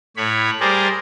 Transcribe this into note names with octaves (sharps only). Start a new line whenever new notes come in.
A2 C#5 B5
G3 G#4 A#4 C5 D5